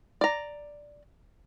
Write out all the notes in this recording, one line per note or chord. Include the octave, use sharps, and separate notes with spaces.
D5 A#5